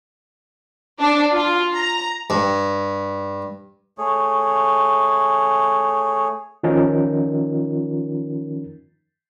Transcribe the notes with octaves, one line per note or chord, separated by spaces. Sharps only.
D4
F4
A#5
G2
A3 G#4 C#5
D#3 F3 C#4 D#4 F4 A#4